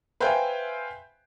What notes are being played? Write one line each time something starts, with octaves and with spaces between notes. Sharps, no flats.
B4 C5 E5 F5 G5 G#5